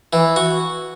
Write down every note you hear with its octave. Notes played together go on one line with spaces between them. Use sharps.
E3
F#4